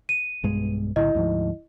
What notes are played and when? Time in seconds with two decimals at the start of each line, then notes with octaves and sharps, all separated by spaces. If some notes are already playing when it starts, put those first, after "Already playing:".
0.09 D#7
0.43 B1 G2 G#3
0.96 B1 A2 D3 E4 D#5
1.15 D2 G#2 F3